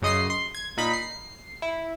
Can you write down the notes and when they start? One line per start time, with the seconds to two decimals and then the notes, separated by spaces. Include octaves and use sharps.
0.02 F#2 C#3 D#5 C6 C7
0.30 C6
0.55 G#6
0.77 A#2 D#4 B5
0.93 C7
1.62 E4